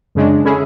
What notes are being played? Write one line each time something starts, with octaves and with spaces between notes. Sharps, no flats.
F#2 C#3 G#3 D4
D3 G#3 C#4 E4 G#4